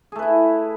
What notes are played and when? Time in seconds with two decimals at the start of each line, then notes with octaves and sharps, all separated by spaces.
0.12 G#4
0.15 A3
0.19 B4
0.22 E4